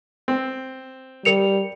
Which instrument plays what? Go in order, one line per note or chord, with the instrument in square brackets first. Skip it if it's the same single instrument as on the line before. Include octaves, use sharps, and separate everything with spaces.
[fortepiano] C4
[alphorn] G3 [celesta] A#4 C#7 F7